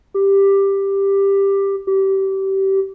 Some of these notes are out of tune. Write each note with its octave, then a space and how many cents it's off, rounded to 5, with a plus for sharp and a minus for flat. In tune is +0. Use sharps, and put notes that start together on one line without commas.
G4 +10
G4 -25